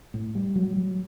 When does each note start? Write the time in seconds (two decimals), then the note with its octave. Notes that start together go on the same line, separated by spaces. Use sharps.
0.14 A2
0.35 G3
0.56 F#3
0.76 F#3